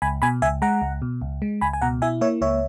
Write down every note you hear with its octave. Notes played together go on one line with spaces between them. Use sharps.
C#2 G#5 B5
B2 G#5 B5
C#2 E5 G#5
G#3 F#5 A#5
C#2
B2
C#2
G#3
C#2 G#5 B5
G#5
B2 F#5 A#5
E4 E5 G#5
A#3 C#5 E5
C#2 C#5 E5